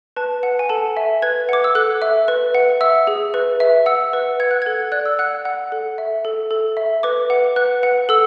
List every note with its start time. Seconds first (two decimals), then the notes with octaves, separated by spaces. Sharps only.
0.16 B4 A5
0.43 F#5
0.59 G#5
0.69 A4 A5
0.97 E5
1.22 B4 G#6
1.49 F#5 D6
1.64 E6
1.75 A4 F#6
2.02 E5
2.28 B4
2.55 F#5
2.81 E5 E6
3.07 G#4
3.34 B4
3.60 E5
3.86 F#5 E6
4.13 B4
4.40 F#5 G#6
4.51 F#6
4.62 A4 G#6
4.92 D5 F#6
5.06 E6
5.19 F#5 F#6
5.45 F#5
5.72 A4
5.98 E5
6.25 A4
6.51 A4
6.77 E5
7.03 B4 D6
7.30 F#5
7.56 B4 F#6
7.83 F#5
8.09 A4 E6